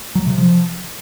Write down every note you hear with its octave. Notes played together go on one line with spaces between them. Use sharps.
F#3
C3
F3